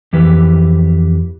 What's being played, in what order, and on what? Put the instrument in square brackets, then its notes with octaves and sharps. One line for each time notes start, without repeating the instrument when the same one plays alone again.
[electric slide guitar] F2 E3 G4 B4